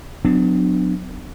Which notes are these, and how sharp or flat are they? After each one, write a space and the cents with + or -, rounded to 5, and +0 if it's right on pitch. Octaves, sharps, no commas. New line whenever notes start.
F#3 -25 B3 +35 D4 +15